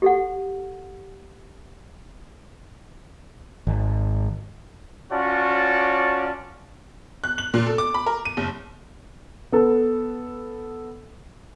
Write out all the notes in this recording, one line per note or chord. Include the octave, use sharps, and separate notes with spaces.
G4 A4 F#5
G#1
C#4 F4 F#4 C#5 D5 A5
F#6
F#7
A#2
A4
D6
B5
A#4
D#7
F#1
B3 A4